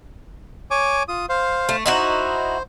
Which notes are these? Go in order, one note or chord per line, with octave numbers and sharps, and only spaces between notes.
C#5 G#5 D6
F4 D#6
C5 F5
A3
D#4 E4 F#4 C5